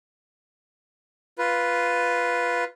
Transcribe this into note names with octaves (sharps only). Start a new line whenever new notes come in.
F4 B4